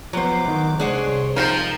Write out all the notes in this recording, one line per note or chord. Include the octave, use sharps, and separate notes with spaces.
F3 F#3 B3 C5 D6
D#3 F#5
C2 G#3 D4 G#4 C5 C#5 F#5
F3 D#4 A#4 C5 G5 A#5